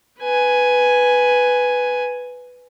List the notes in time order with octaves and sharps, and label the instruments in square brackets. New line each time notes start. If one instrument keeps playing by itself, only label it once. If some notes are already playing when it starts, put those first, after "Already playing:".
[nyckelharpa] B4 G#5